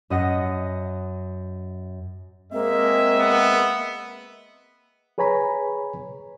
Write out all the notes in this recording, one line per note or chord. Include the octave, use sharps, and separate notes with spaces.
F#2 D#5 F#5 A#6
G#3 A#3 C4 D#5 E5
B3
G#4 B4 C#5 G#5 A#5 B5